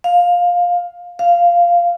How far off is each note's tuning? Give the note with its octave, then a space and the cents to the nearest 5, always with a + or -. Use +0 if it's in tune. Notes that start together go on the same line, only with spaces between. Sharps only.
F5 +15
F5 -10